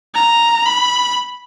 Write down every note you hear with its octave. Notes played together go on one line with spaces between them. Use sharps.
A#5
B5